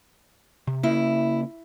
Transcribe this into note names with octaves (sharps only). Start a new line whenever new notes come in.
C3
C#3 A#3 E4